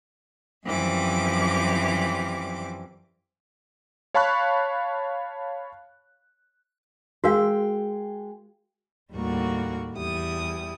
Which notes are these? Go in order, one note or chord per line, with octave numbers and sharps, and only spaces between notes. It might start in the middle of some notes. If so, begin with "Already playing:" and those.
F#2 E3 F3 G3 C4 D6
C#5 F5 A5 B5 C#6 F#6
G#3 F#4 A#4 F5 G5
D#2 A2 G3 A#3 F#4 C#6
E2 G3 E4 D#6